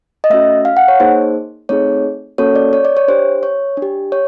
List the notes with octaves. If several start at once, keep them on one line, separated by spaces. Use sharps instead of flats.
D#5
A3 C#4 F#4 E5
F5
F#5
C#5
A#3 D#4 G#4 C5
A3 C4 D#4 G#4 C#5
A#3 C#4 F#4 A4 C#5
D5
C#5
D5
C#5
D4 G4 C5
C#5
D4
G4
C#5